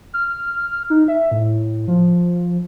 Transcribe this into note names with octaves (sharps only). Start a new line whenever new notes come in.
F6
D#4
E5
A2
F3